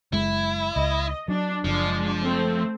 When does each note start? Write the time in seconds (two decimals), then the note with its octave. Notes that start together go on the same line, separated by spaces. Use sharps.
0.13 F#1 G#3 E4
0.76 C#2 D#5
1.28 F#3 D4
1.64 F#1 F3 G#3 D4
2.22 A3 C4